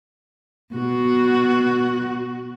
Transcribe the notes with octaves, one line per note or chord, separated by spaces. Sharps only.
B2 F#4